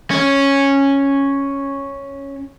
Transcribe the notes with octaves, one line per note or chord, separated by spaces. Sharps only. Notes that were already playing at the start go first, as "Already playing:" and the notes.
C#4